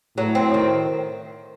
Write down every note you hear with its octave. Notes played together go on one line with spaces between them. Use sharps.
A2 F#3
C4
D#3